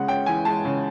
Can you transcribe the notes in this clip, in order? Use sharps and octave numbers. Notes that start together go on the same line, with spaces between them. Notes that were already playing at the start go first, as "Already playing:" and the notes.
Already playing: C#3 G#3 F#5
C#4 G5
E3 G#5
G#3 A5
C#3